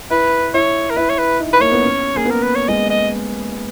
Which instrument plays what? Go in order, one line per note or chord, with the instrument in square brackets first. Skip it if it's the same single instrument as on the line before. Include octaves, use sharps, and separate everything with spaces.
[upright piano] E4 [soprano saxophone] B4
[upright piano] E4 [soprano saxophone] C#5
[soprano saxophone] A#4
[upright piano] E4 [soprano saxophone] B4
[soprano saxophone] C#5
B4
[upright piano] D#4
[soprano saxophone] B4
[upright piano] A#3 [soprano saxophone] C#5
[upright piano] B3
C#4
[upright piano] A#3 [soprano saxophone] G#4
[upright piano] B3
[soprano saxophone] A#4
B4
C#5
[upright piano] G#3 [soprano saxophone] D#5
[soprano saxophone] D#5